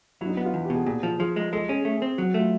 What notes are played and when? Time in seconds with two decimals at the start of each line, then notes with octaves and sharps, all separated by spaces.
0.21 F#3 D4 E4
0.29 D#4
0.37 B3 E4
0.45 F4
0.54 E2
0.65 G4
0.70 B2
0.75 G#4
0.86 A#2 G#4
1.03 F3
1.19 F3 G#4
1.36 G#3
1.53 G#3 A4
1.68 C#4 G#4
1.85 A3
2.02 C4
2.18 F#3
2.34 A3
2.40 F4